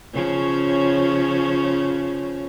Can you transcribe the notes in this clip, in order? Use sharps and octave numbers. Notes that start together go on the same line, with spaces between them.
C#3 F3 C#4